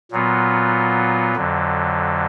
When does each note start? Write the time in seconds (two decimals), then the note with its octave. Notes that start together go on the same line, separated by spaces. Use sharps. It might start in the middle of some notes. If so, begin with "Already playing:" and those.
0.11 A#2 F#3 B3 F4
1.36 F2 D3 F#3